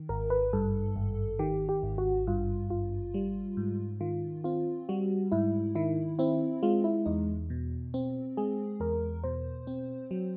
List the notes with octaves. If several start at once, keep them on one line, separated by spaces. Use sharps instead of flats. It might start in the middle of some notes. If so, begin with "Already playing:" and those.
Already playing: D#3
G#1 A#4
B4
G2 A4
G#1
D#3 G4
G4
G#1
F#4
G2 F4
G#1 F4
G3
G#2
D#3 F4
C4 F4
G3 F#4
G#2 E4
D#3 E4
C4 E4
G#3 F4
E4
E2 D#4
B2
C4
G#3 G#4
E2 A#4
B2 C5
C4
F#3